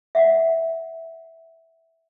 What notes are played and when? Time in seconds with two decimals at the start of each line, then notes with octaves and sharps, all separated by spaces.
0.15 E5 F#5